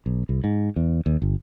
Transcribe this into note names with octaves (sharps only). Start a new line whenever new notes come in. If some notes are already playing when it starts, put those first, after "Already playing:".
B1
C2
G#2
E2
D#2
G1